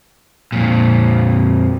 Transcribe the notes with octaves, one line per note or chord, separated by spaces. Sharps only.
F2 A#2